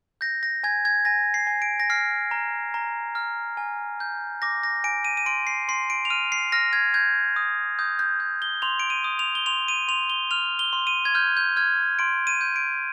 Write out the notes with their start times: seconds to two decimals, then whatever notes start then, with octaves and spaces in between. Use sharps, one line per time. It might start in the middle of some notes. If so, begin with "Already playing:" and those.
0.21 G6 A#6
0.43 A#6
0.64 G#5 G#6
0.85 G#6
1.05 G#5 A#6
1.34 C7
1.47 G#5
1.62 D7
1.80 A#6
1.90 F6 C7
2.31 A#5
2.74 A#5
3.15 F6
3.57 G#5
4.00 G6
4.42 D6 A#6
4.63 A#6
4.84 G#5 D7
5.05 D#7
5.17 D#7
5.26 C6 D7
5.47 C7
5.68 C6 C7
5.90 D7
6.05 F7
6.10 F6 D#7
6.32 C7
6.52 F6 A#6
6.73 G#6
6.94 G6 G#6
7.36 D#6
7.79 D#6 G6
7.99 G6
8.20 G6
8.42 G7
8.62 C6 F7
8.80 D7
8.90 D#7
9.04 D#6
9.19 F7
9.35 G7
9.46 C6 F7
9.68 D#7
9.88 C6 F7
10.10 G7
10.31 F6 F7
10.59 G7
10.73 C6
10.87 D#7
11.05 G#6
11.15 F6 G6
11.37 G6
11.57 F6 G#6
11.99 C6 D7
12.27 D#7
12.41 G6
12.56 D7